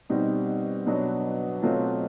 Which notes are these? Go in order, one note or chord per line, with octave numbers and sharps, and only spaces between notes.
B2 G3 C4 D#4
B2 F#3 B3 D4 F#4
B2 F#3 A3 C4 F4